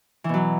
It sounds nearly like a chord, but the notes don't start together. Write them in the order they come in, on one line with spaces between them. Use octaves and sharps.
E3 B2 F#3